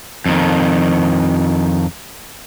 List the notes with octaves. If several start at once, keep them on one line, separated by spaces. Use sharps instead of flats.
F2 D#3